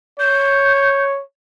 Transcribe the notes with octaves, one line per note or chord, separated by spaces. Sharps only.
C#5 G6